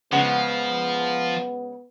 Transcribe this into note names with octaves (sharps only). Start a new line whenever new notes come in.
C#3 F3 G#3 B3 F#5